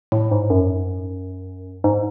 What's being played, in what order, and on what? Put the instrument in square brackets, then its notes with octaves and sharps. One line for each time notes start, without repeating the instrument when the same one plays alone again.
[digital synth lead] A2
G#2
F#2
G#2